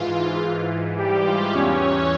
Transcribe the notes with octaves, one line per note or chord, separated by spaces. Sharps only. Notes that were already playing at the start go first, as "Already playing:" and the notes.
Already playing: G#2 E3 F4
G#2 E3
G3 G4
F4
E2 E3 C#4 C#5